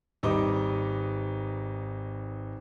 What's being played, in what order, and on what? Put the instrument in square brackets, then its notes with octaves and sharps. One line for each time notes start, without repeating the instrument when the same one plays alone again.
[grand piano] G#1 G3 D#4 B4 D6